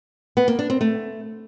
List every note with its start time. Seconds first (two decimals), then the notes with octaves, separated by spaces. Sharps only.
0.37 B3
0.48 A#3
0.59 D4
0.70 C4
0.81 A3